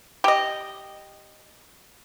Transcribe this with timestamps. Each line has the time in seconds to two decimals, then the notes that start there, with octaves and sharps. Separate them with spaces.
0.24 G4 D#5